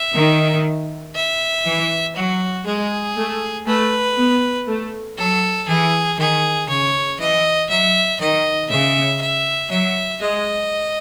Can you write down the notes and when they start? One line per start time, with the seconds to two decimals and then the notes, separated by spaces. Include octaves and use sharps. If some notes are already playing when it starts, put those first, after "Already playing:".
Already playing: E5
0.15 D#3
1.15 E5
1.66 E3
2.16 F#3 F#4
2.66 G#3 G#4
3.17 A3
3.67 A3 B4
4.18 B3
4.68 A3
5.18 F#3 A4
5.68 E3 G#4
6.18 D#3 G#4
6.68 C#3 C#5
7.19 E3 D#5
7.69 F#3 E5
8.20 D#3 D#5
8.70 C#3 E5
9.21 E5
9.70 F#3 E5
10.20 G#3 D#5